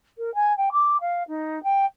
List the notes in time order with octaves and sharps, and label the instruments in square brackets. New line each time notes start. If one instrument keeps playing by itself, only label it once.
[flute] A#4
G#5
G5
D6
F5
D#4
G5